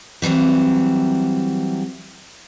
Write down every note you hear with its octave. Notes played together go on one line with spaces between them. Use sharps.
E3 F#3 G3 C4